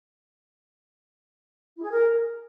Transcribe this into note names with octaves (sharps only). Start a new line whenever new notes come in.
E4
G#4
A#4